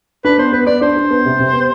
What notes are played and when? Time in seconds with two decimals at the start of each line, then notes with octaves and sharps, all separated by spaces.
0.25 D4 B4
0.38 B3 C5
0.52 B3 B4
0.67 B3 D5
0.81 D4 C5
0.97 D4
1.10 B3
1.25 C3
1.39 C3
1.53 B3